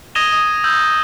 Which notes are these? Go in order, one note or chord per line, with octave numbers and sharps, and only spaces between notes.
D#6 G#6 A#6 D#7 E7 G7
D#6
E6 G6